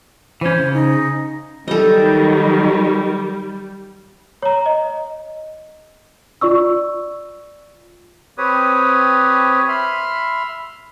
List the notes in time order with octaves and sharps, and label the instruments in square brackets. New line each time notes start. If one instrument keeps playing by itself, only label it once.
[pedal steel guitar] E3 C#4 [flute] C5
[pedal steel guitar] C#3
[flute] D#4
[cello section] D#3 F#3 [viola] G3 [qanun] A4 D#5
[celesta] C#5 A#5
D#5
F4 D5 C#6 E6
[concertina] C4 G4 B4 C#5 D#6
E5 B5 C6 F6